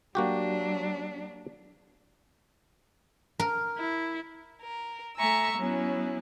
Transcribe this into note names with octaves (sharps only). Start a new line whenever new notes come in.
F#3 A#3 D4 F#4 G4
A#4
E4
A#4
A3 E5 G#5 A#5 C#6 E6
F#3 B3 C#4 E4